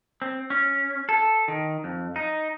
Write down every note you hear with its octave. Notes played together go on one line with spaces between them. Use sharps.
C4
C#4
A4
D#3
F2
D#4